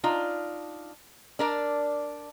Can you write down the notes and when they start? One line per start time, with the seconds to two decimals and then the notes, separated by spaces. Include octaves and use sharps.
0.04 D4 D#4 F4
1.39 D4 A#4 D5